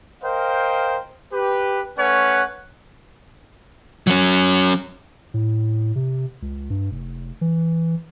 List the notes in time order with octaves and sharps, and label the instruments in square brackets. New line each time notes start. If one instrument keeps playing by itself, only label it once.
[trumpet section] A#4 C5 D#5 F5 G5
G4 B4
A3 C#4 B4 C#5 F#5
[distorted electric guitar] F#3 C#4
[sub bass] A2
C3
C#2
G2
F1
E3